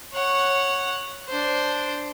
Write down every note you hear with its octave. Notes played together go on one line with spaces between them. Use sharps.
C#5 F#5
D4 C5